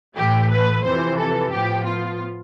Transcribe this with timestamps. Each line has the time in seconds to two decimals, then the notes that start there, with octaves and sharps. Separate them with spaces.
0.16 A2 E3 A3 G4
0.50 B4
0.84 F2 C3 E3 C5
1.18 A4
1.51 A2 F3 B3 G4
1.85 F4